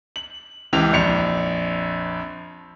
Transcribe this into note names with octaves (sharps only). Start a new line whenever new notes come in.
F#7
C#2 E3 G4 F7
A#1 F2 C#7 F7